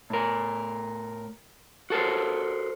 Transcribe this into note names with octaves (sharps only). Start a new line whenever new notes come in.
A2 A#4
F#4 A4 A#4 C5